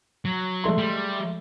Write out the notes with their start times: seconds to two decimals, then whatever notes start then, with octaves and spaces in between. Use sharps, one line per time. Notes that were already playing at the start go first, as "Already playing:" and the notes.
0.25 F#3
0.64 G#3 A3 C6
0.78 G3